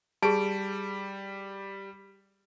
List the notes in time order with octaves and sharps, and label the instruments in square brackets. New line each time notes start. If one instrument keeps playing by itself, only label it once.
[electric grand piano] G3 D7 [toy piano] G#4 A5